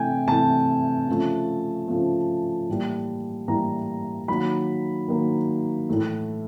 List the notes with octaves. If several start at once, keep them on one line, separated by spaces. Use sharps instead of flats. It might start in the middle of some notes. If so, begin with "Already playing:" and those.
Already playing: C3 E3 A3 G5 G#5
C3 E3 A3 A5
C#3 F3 A3
C#3 F3 A3
A2 E3 G3 A#3
A2 E3 G3 A#3 A#5
D#3 F#3 A#3 B5
D#3 F#3 A#3
A2 E3 A3